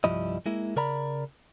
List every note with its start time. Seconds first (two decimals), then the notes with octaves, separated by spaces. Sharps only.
0.04 C2 G2 F3 G3 E4 D#5
0.46 G#3 A#3 E4
0.76 C#3 A#4 D5 A#5 B5